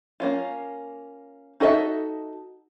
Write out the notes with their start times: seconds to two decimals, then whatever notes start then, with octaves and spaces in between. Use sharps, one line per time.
0.20 A#3 C#4 F4
1.60 D#4 F#4 A4 D#5 E5